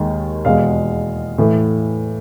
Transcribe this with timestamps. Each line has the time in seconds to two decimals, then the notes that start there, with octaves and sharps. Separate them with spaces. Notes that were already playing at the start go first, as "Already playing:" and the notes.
Already playing: D#2 D#3 G#3
0.45 E2 B2 G#3 F5
1.38 A2 E3 A3